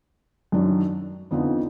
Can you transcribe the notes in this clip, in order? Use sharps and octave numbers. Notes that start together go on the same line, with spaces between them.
F#2 D#3 F#3 D4
F2 D3 F3 B3 D#4